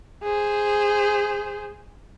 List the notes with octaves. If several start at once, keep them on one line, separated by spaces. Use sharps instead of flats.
G#4 C5